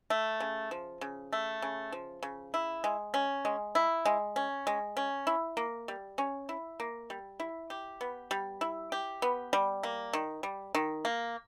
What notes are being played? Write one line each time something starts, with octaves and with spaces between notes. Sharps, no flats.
A3
C#3
F3
C#3
A3
C#3
F3
C#3
E4
G#3
C#4
G#3
E4
G#3
C#4
G#3
C#4
E4
A#3
G3
C#4
E4
A#3
G3
E4
G4
B3
G3
E4
G4
B3
G3
A#3
D#3
G3
D#3
A#3